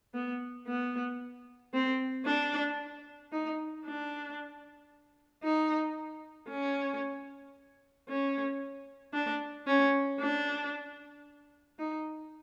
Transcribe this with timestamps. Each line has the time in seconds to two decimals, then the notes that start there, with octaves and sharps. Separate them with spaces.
0.14 B3
0.67 B3
1.74 C4
2.26 D4
3.32 D#4
3.85 D4
5.43 D#4
6.49 C#4
8.09 C#4
9.14 D4
9.67 C#4
10.20 D4
11.79 D#4